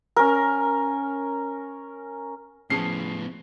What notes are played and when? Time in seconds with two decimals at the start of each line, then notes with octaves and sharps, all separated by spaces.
0.17 C#4 A#4
2.70 A2 F3 B3 C#4 G#4 A5 C7